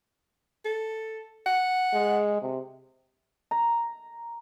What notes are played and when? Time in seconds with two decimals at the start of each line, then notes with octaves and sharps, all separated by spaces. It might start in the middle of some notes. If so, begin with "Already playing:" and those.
0.65 A4
1.46 F#5
1.94 G#3
2.42 C3
3.51 A#5